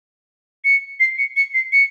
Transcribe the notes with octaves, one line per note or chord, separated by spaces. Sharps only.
C#7
C7
C#7
C#7
C7
C#7